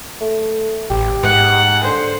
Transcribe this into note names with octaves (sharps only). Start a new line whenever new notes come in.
A3
A1 G4
G#2 F#5
D3 C5